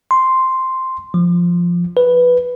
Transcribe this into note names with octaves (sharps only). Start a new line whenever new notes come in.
C6
F3
B4